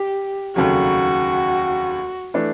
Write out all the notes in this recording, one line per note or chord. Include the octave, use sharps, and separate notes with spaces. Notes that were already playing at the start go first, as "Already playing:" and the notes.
Already playing: G4
F1 D#2 C#3 F#3 F#4
E3 A3 D4